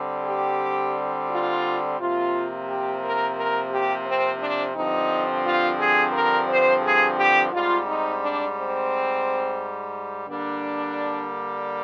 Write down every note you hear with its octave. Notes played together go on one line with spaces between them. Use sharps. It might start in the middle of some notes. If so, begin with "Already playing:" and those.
Already playing: D3 G3 C4
G4
F4
C3 F3 A#3 F4
G4
A#4
A#4
G4
C4
D4
G2 D3 F3 C4 D#4
F4
G#4
A#4
C5
G#4
G4
G#2 G3 C4 F4
D#4
D4
C4
D3 G3 A#3 D4